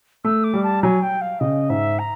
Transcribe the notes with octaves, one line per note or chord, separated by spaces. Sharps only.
A3 E6
D6
G3
A5
F#3 G#5
G5
F5
C#3 D#5
G#2 E5
A#5